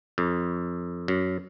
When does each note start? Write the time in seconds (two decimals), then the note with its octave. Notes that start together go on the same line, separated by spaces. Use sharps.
0.18 F2
1.08 F#2